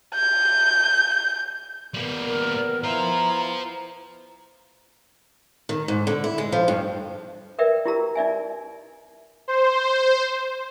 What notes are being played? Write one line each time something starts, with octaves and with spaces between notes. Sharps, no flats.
G6
G3 A#3 B3
A#4
E4 C5 F5 A#5
D#3
G#2
D3
E4
G#3
F3
G2
A#4 B4 D5 E5 G5
E4 F#4 G4 A#4 A#5 E6
D#4 D5 E5 G#5
C5